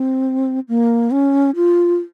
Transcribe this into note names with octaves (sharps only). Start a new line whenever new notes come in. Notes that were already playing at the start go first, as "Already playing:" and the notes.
Already playing: C4
A#3
C#4
F4